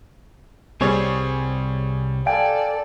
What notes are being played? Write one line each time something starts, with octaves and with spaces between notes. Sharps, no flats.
C2 G3 C4 G#4 C#5
A4 D5 F5 G5 G#5